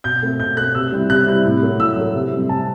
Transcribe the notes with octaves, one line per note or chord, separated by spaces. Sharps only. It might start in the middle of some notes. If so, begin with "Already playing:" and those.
B2 G6
A3 C4
B2 G6
A3 C4 F#6
C3 E6
G3 C4 E4
C3 F#6
G3 C4 E4
A2
F#3 A3
A2 E6
F#3 A3
C3
G3 C4
C3 A5